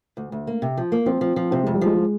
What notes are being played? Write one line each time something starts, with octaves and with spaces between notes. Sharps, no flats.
D2
D2
A#3
C3
F3
A#3
F3 C4
F3
F3
C3 C4
F2 G#3
G3
F3 G#3
G#3